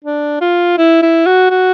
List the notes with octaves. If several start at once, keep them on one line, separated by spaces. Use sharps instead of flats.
D4
F4
E4
E4
F#4
F#4